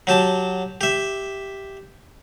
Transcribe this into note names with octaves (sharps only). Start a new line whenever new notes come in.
F#3 G4 A5
G4 E5